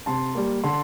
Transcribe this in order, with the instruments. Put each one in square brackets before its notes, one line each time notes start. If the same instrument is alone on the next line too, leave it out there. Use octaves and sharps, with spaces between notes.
[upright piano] C3 A5 C6
G3 A#3
D3 A5 C6